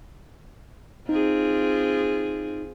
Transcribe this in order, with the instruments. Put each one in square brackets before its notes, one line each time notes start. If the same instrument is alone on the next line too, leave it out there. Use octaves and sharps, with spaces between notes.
[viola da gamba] C4 F4 G#4 [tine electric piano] D#4